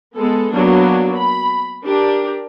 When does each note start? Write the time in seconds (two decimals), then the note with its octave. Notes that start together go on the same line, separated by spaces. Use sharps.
0.16 G#3 B3 A4
0.51 F#3 A#3 B3 D4
1.15 B5
1.84 D4 G4 A#4